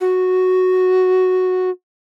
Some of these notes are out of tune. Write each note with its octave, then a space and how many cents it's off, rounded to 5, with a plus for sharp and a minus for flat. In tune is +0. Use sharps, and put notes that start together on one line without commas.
F#4 +0